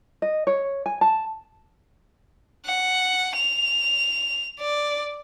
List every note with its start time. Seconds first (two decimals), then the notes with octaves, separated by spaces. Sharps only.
0.22 D#5
0.47 C#5
0.86 G#5
1.01 A5
2.66 F#5
3.36 F7
4.60 D5